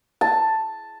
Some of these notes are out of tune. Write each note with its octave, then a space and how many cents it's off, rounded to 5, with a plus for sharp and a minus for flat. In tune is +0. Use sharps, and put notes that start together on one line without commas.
A5 +5